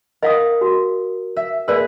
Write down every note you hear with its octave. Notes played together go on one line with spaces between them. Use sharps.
A#4 D#5 F5 D#6
F#4
E5
A#3 G#4 A#4 B4 D5